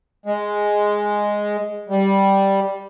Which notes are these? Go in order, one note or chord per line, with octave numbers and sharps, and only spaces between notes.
G#3
G3